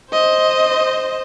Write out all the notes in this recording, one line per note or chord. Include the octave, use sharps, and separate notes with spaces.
C5 D#5